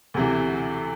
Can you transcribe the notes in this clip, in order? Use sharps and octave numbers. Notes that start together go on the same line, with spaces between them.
D2 C3 E3